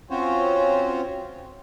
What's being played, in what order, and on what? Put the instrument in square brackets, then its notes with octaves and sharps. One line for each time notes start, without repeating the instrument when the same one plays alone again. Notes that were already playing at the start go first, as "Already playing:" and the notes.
[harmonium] C4 C#4 F4 F#4 C5 C#5